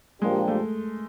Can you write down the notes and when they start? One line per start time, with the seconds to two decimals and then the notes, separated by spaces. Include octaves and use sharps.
0.22 A#2 F3 G#3 A#3 D4 G4
0.48 A3